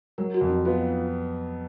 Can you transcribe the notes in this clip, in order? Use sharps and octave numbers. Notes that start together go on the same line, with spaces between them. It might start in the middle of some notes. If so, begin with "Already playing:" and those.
F#3 A#4
F#4
F2
D#4
B3 F4